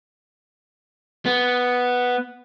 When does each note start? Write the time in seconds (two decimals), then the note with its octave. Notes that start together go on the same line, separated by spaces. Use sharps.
1.26 B3